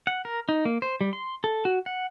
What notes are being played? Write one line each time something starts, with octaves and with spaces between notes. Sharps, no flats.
F#5
A#4
D#4
A#3
C5
G3
C6
A4
F#4
F#5